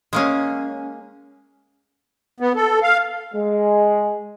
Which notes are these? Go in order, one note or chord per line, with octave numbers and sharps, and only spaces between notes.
G#3 A#3 C#4
B3
A4
F5
G#3